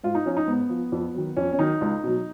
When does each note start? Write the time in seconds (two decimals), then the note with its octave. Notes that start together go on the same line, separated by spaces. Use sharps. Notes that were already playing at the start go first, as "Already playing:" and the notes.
0.04 G#2 F4
0.15 D#4
0.26 F3 C#4
0.37 D#4
0.47 G#2 B3
0.70 F3
0.92 F2
1.15 D#3 F#3
1.37 F2 C#4
1.53 C#4
1.59 D#3 F#3 D#4
1.81 C#2
2.04 B2 F#3